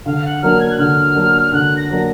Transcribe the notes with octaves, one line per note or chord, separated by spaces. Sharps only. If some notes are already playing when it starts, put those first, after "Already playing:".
D3 F5
F#5
F#3 A#3 D4 F6
G#6
F#6
D3 F6
F#3 A#3 D4
D3 F#6
A#6
F#3 A#3 D4